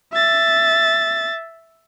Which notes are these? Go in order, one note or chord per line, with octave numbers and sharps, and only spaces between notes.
E5 A6